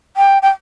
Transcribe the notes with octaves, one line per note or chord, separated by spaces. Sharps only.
G5
G5